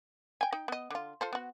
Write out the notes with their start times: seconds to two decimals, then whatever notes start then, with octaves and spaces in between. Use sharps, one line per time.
0.41 G5 G#5
0.53 D#4 G5
0.68 B3 D#5
0.90 D3 F4
1.21 F4 A4 C5
1.33 B3 F#4